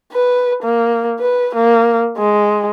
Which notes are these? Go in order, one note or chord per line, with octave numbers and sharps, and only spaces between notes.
B4
A#3
B4
A#3
G#3